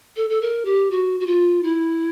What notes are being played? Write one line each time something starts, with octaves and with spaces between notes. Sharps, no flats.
A4
A4
A#4
G4
F#4
F#4
F4
E4